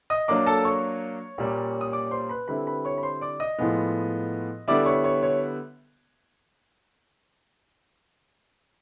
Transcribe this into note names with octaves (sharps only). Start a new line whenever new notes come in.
D#5 D#6
F#3 A#3 D4 D5 D6
A4 A5
C#5 C#6
A#2 G3 A#3 C#4
D#6
D5 D6
C5 C6
B4 B5
D3 G3 C4 E4 B4 B5
B4 B5
C#5 C#6
B5
C5 C6
D5 D6
D#5 D#6
A2 F3 G#3 B3
D3 G3 B3 E4 D5 D6
C#5 C#6
C#5 C#6
C#5 C#6